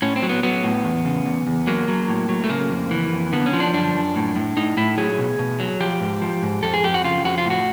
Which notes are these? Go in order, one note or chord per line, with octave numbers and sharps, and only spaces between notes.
A2 C#4
C4
F#3
B3
F#3 B3
A2
E2
C#3
E2
E2
F#3 A#3
F#3
A2
F#3
A3
C#3 A#3
F2
E3
F2
D3 B3
C#4
F3
D4
F#2 D4
F#2
A2
A2
A2 D#4
A2 E4
F#3 G#4
B2
B2
F#3
F3 G4
G#2
F3
G#2
F2 A4
G#4
F2 G4
F#4
C#3 F4
F2 F#4
F4
A2 F#4